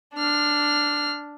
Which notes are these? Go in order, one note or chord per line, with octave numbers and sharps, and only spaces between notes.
D4 F6